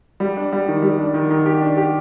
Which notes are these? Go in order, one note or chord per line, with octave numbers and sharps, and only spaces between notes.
G3
D4
G3
D#3
G3
D4
D#3
D#3
G4
D4
G4